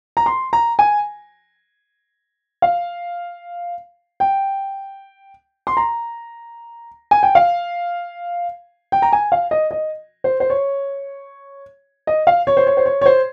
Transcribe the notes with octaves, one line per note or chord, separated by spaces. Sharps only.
A#5
C6
A#5
G#5
F5
G5
C6
A#5
G#5
G5
F5
G5
A#5
G#5
F5
D#5
D#5
C5
C5
C#5
D#5
F5
C#5
C5
C#5
C5
C#5
C#5
C5